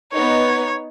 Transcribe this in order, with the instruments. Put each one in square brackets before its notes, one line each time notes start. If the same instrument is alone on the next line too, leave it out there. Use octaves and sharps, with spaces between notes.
[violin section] B3 D#4 [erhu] C#5